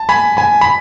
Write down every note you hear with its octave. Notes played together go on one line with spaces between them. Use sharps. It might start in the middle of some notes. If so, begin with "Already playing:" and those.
Already playing: A5
G#5 B5
G#5 B5
B5